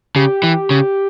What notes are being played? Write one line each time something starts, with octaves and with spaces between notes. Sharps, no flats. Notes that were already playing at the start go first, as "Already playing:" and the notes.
C#3 G4
E3
C#3